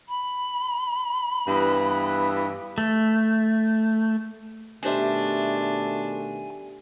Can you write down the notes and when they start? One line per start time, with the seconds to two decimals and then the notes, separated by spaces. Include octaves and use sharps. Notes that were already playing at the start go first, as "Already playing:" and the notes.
0.09 B5
1.48 G2 E3 B3
2.78 A3
4.83 B2 D#3 G3 A3 D4 C5 E5 G#5